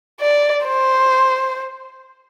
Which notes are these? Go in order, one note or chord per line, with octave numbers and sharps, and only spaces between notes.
D5
C5